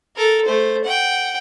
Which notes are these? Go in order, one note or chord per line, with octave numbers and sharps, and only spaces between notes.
A4 A#4
A3 C5
F#5 G5